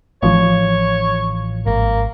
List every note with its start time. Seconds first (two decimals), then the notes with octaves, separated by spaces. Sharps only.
0.23 A1 F3 C#5
1.66 G#1 A#3